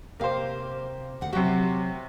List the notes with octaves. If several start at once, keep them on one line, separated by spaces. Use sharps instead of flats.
C3 A#3 G4 C5 F5
D2 F#5
C3 F#3 F#4 G4